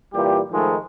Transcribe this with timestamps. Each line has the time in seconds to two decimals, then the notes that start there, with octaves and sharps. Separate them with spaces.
0.14 A#2 E3 G3 G4
0.52 G#2 D#3 F3 G#3 A3